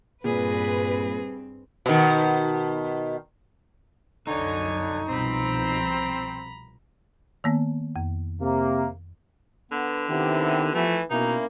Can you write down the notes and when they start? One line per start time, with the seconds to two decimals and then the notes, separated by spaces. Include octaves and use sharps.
0.24 G2 A#2 C4 G#4 B4
1.86 B2 D#3
4.27 C2 F#2 D3 D#4 C#5 G#5
5.08 C2 B2 F3 C4 A#5 B5
7.44 D#3 A#3 B3
7.96 F2
8.41 C3 A#3
9.72 D3 B3
10.09 C3 D#3 B3 E4 G4
10.74 E3 F3 A3
11.11 B2 A#3 C#4 D#4 E4